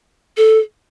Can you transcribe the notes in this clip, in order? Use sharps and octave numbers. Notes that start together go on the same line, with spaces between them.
A4